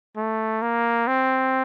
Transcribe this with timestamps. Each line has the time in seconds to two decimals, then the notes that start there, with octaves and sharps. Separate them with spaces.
0.17 A3
0.62 A#3
1.07 C4